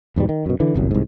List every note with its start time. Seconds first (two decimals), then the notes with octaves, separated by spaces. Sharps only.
0.16 E2 G#2 B2 G3
0.29 D#3
0.46 F#2 B2
0.60 D3 E3
0.75 G1 C2 F#2
0.91 C2 G#2